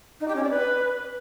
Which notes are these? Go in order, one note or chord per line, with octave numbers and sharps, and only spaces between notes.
D#4
G4
C#4
D5
B4